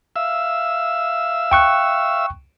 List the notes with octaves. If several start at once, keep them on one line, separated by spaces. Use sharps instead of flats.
E5 F5 E6
G5 C#6 F#6